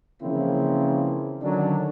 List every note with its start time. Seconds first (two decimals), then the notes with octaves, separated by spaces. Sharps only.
0.22 C#3 E3 F3 A#3 C4 E4
1.42 D3 D#3 F#3 C#4 D4